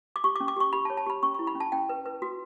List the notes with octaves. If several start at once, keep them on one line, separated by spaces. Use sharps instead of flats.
D6
G4 C#6
D6
C#4
D6
G4 C#6
G4 B5
A5
C#5
A5
G4 B5
C#4 C#6
E4 C#6
B5
C#4
A5
C#4 G5
B4
B4
F#4